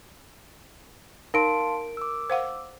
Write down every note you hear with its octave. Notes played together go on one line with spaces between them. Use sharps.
D#4 A#4 F5 A5 C6 D7
D6 E6
C5 F5 F#5